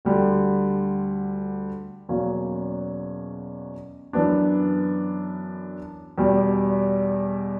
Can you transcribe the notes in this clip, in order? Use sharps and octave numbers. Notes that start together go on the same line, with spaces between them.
D2 D3 G3
E2 B2 F#3 A#3 C#4
F#2 E3 B3 D4
E2 B2 G3